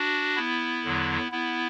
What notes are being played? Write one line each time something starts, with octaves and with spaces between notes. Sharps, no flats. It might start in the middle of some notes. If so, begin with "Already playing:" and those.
Already playing: D4 F#4
B3 E4
E2 D3 F#3
B3 E4